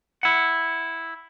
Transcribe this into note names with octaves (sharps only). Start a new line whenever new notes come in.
E4 F#5